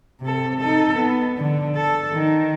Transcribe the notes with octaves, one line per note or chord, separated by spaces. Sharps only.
C3 A4
D#4 A4
B3
D3
A4
D#3